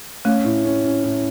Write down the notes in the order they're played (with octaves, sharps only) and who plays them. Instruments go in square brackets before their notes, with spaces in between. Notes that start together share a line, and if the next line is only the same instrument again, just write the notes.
[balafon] A3 [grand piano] C#4
[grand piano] A2
C#4
C#4
A2